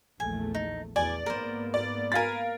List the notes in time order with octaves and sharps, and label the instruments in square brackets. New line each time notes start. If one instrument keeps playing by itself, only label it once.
[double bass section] A#1 E2 A3 [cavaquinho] G#5
[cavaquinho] D#4
[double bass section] E2 [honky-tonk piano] D5 [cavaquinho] G#5
[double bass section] G#2 A#3 B3 [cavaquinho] A#4 C5
[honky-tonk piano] D5
[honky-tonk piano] A#4 F5 A6 [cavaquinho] G#5 B5